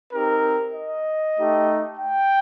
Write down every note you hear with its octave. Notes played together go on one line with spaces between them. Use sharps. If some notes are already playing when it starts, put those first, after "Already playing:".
C4 D#4 G4 A#4
D#5
A3 D#4 G4
G5